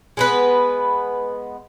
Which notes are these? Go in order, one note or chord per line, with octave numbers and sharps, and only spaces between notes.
G#3 B3 B4